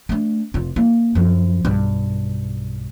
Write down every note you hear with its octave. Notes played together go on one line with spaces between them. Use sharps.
A3 D4
F1 F4
A#3 E4
F#2 F3
B1 G2